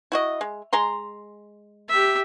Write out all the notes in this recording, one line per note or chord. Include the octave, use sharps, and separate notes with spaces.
E4 F#4 D#5
G#3
G#3 A#5 C6
G4 E5